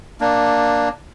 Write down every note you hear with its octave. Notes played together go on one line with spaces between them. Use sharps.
A#3 D4